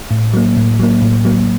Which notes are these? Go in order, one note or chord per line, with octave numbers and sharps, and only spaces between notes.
A2
F#3 A#3
A2
F#3 A#3
A2
F#3 A#3